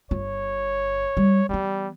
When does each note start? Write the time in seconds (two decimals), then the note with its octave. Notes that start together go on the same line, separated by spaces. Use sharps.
0.11 G1 F4 C#5
1.17 G3
1.49 E3 G3 B3